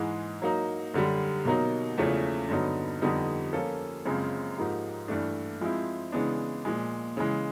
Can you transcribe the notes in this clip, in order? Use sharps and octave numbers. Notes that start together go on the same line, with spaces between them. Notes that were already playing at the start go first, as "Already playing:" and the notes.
Already playing: G#2 E3 G#3
F#3 A#3 D#4
F#2 D3 G3
B2 F#3 A#3 D#4
E2 C#3 F3 A3 C#4
G2 D3 F#3 B3 D#4
F2 D3 G3 B3 D#4
F3 A#3 C#4 F4 A4
F#2 C#3 F3 G#3 C4
G#2 F3 A#3 D#4 G4
G2 E3 A3 D4
F3 G#3 C4 E4
C#3 E3 G#3 B3 D4
A#2 F3 G#3
C#3 E3 G#3